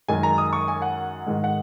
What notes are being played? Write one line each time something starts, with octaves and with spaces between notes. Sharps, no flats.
F#2 D#3 G#3 G#5
A#5
D#6
C#6
G#5
F#5
G#2 D#3 G#3
F#5